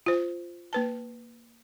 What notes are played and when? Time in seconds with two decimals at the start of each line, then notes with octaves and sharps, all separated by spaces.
0.06 F4 C5
0.73 A#3 B4 A5